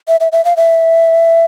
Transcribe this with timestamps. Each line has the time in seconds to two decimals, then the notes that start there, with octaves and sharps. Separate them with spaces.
0.08 E5
0.20 E5
0.32 E5
0.45 F5
0.57 E5